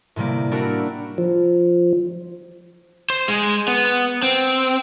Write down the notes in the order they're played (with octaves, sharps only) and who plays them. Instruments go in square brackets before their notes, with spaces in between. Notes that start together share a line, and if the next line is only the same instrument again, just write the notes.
[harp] A2 C3 G3 A#3
C4 D4 E4 F#4 A#4
[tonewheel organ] F3
[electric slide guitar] C5
G#3
B3
C4